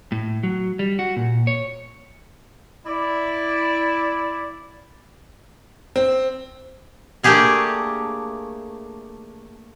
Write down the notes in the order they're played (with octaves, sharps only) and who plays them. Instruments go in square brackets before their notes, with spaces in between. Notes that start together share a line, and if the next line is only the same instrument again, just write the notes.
[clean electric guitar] A2
F#3
G3
F#4
A#2
C#5
[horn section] E4 D5
[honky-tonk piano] C4
[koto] A3 A#3 D4 G4 G#4 A#4